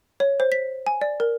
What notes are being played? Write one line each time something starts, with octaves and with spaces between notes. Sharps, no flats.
C#5
C5
B6
G#5
D5
A#4